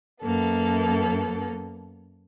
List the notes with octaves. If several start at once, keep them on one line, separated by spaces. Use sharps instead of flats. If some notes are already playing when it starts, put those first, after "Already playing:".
F#2 A#3 B3 A4